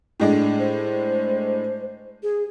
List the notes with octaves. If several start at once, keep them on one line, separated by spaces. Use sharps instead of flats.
A2 G#3 D4
C5
G#4